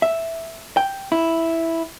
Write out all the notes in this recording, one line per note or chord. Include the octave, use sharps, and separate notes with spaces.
E5
G5
E4